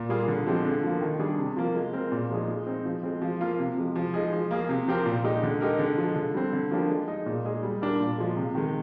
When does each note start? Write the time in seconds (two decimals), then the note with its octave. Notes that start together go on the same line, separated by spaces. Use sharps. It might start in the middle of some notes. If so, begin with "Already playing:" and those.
Already playing: A#2
0.09 G3 A#3 F4 G#4
0.28 D3
0.46 F3 G#3 C4 G4
0.65 D3
0.83 F3 A#3
1.01 D#3
1.19 G3 D4 G#4
1.38 C3
1.57 F3 A#3 F4
1.75 G#3
1.93 C4 F4 A#4
2.12 A#2
2.30 F3 G#3 D#4 G#4
2.48 G#3
2.66 C4 D#4
2.85 F3
3.03 G#3 C4
3.22 F3
3.41 A#3 F4
3.59 C3
3.76 F3 G#3
3.96 F3
4.14 G#3 D#4 G#4
4.32 F3
4.51 A#3 F4 G#4
4.69 C3
4.87 F3 C4 G4 A#4
5.06 A#2
5.24 G#3 D#4 G4
5.43 D3
5.61 G#3 D#4 G4 A#4
5.79 D3
5.98 F3 G#3
6.16 D3
6.34 G3 C4
6.53 D3
6.71 F3 A#3 D4 G4
6.90 G#3
7.08 D#4 G#4
7.26 A#2
7.45 G#3 D#4 G#4
7.63 G3
7.81 D4 G4 A#4
8.00 A#2
8.18 F3 G#3
8.36 C3
8.55 D#3 G#3